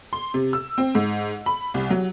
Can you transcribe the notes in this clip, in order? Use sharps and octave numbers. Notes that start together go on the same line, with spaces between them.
C6
C3
E6
C4
G#2
B5
C2
F#3